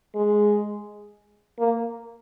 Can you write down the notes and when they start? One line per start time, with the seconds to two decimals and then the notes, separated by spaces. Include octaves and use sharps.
0.15 G#3
1.59 A#3